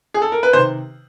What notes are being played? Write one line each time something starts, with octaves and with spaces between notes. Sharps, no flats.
G#4
A4
A#4
B4
C3 D#3 C5